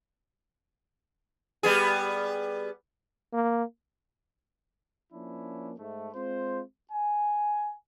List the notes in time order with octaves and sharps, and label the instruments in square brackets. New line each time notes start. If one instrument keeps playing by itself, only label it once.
[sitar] G3 B3 G#4
[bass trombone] A#3
[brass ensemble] F3 A#3 C#4 D4 E4
G#2 A3
G#3 C4 F4 C5
G#5